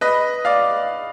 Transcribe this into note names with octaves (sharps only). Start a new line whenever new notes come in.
B4 D#5
D5 F5